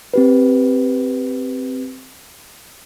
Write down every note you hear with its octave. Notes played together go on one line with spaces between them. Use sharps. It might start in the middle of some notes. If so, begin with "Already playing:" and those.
C4 G4 B4